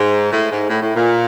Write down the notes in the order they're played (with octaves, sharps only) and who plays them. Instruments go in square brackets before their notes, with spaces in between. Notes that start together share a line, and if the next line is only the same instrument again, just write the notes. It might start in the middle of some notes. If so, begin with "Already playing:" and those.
Already playing: [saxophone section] G#2
A2
G#2
A2
A2
A#2